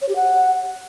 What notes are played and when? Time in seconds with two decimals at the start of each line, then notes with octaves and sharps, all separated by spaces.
0.02 C#5
0.09 G4
0.16 F#5